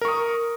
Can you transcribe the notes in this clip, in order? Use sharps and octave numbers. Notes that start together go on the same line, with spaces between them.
A#4 C#6 D#6